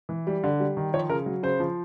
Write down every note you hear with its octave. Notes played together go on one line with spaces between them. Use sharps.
E3
G3
D3
G3
D#3
F3 C#5
C#3 A#4
F#3
C#3 C5
F3